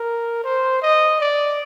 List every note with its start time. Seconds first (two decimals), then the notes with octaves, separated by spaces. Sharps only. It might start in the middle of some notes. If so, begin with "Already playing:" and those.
Already playing: A#4
0.44 C5
0.82 D#5
1.20 D5